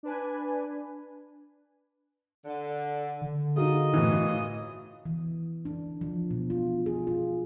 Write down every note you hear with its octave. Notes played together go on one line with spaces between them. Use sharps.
D4 B4 G#5
D3
D3
A#3 D#4 F4 F#4 G#4 D#5
A2 E3
E3
D4
F3
B2
F4
G#4
F4